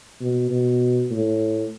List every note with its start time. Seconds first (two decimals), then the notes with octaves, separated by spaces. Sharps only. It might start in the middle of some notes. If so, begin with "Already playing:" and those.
0.21 B2
0.51 B2
1.11 A2